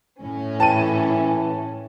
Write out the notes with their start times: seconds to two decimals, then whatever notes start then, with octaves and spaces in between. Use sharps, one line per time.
0.21 A2 C#4
0.60 E3 G5 A5 D#7